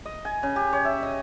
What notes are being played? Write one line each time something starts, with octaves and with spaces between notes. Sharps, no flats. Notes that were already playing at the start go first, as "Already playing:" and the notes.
D#5
G#5
C#3
G4
C#5
E5
D#5